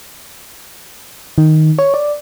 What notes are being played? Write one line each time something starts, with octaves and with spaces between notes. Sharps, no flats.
D#3
C#5
D5